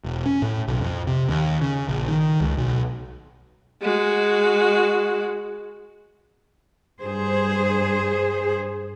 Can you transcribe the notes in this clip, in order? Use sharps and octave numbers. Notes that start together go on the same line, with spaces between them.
E1
C#4
A2
B1
F2
C3
D#2
C#3
A#1
D#3
C#2
B1
G#3 F#4
G2 G#4 C5